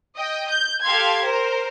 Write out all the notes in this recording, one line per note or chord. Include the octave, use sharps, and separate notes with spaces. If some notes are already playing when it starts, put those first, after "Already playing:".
D#5 G5
G6
G4 A4 F5 C6 G#6
A#4 C5